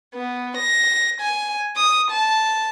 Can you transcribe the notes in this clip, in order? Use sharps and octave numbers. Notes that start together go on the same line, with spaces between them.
B3
A#6
G#5
D#6
A5